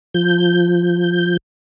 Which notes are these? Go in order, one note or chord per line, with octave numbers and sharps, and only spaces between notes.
F3 G6